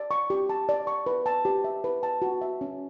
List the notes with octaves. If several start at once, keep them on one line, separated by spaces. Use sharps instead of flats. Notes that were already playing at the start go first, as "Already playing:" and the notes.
Already playing: D5
C#6
G4
A5
D5
C#6
B4
A5
G4
E5
B4
A5
F#4
E5
C#4